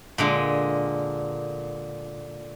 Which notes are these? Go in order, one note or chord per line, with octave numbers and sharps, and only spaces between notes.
A#2 D3 G#3